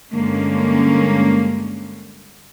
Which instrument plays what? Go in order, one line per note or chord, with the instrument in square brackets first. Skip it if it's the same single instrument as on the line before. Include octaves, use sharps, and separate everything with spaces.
[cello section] G2 D3 G#3 A#3 C#4